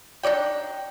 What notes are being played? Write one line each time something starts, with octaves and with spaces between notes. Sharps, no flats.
D4 D#4 D5 G5